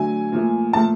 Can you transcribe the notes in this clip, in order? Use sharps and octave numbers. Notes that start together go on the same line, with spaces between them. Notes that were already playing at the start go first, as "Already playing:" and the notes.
Already playing: D3 F#3 A3 G#5
A#2 F3 A3
A#2 F3 A3 A5